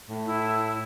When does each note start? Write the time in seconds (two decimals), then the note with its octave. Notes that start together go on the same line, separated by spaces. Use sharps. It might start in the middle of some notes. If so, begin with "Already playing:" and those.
0.09 A2
0.26 E4